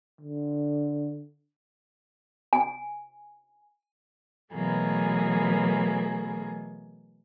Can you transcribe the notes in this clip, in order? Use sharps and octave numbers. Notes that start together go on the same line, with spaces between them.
D3
G#5
B2 E3 F#3 A3 A#3 G#4